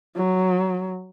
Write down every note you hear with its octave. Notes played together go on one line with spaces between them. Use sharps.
F#3